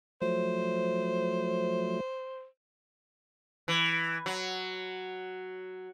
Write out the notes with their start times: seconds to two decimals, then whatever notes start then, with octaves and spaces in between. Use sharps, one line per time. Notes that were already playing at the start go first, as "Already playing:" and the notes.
0.22 F3 F#3 A3 C5
3.68 E3
4.26 F#3